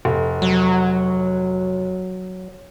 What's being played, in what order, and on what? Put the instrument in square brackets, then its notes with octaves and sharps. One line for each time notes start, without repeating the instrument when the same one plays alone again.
[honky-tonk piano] F1
[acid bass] F#3